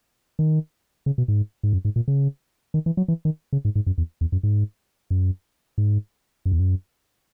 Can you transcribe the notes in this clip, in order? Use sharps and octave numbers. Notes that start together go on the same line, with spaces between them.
D#3
C#3
B2
G#2
G#2
F#2
G#2
A#2
C#3
D#3
E3
F#3
E3
D#3
C#3
G#2
G#2
F#2
E2
E2
F#2
G#2
F#2
G#2
F#2
E2
F#2